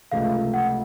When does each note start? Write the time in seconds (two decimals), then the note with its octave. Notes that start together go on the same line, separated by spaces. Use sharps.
0.12 C#2 C3 F3 A3 F5
0.54 F#5